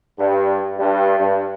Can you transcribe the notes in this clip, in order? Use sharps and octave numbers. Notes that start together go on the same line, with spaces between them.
G2
G2
G2